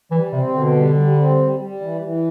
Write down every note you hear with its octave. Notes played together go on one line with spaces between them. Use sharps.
E3 G3
C3 C4
B2 D3
G3
G3
C4
G3
G3
E3
E3